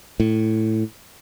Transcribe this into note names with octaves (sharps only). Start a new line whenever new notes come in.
A2